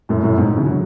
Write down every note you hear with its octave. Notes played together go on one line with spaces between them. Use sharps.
F#2 A2
F#2 A2
G#2 B2
C#3 E3
D3 F#3